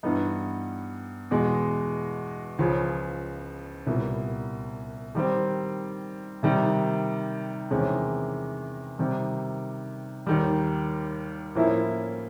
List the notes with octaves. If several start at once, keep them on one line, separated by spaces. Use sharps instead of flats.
G2 E3 G3 B3 D#4
E2 B2 G#3
C#2 C#3 F3
C2 A#2 G3 B3
D#3 G3 C4
C3 D#3 G3
E2 C3 D#3 G#3 C#4
C3 D#3 G3
D#2 D#3 G3
A2 F3 A#3 C#4 E4